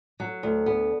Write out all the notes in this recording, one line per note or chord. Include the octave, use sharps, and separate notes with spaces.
F#3
D2
B3